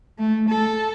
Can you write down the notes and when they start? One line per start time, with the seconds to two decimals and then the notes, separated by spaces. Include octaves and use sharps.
0.19 A3
0.49 A4